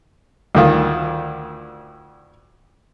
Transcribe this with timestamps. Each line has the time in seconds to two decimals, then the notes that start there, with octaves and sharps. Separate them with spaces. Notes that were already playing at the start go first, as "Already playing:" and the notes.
0.55 D2 D#3 F4